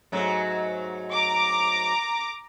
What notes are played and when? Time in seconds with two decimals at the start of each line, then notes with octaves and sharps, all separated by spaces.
0.12 G#2 F#3 A3
1.12 A#5 D6